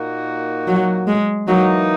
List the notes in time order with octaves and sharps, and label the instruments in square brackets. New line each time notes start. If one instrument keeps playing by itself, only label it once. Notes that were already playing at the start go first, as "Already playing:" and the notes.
Already playing: [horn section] A#2 A#3 D#4 F#4
[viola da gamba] F#3
G#3
[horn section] E3 A#3 D#4 [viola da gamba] F#3